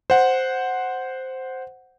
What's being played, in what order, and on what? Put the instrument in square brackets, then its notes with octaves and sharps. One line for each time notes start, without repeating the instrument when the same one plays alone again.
[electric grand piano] C5 F#5